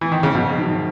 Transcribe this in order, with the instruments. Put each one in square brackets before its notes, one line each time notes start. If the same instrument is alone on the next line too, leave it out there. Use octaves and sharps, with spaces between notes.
[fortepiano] E3
D#3
C#3
[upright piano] A#1 [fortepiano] B2
[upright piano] G#2 D#3 F#3